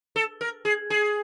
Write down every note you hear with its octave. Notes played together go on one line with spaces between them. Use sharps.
A4
A#4
G#4
G#4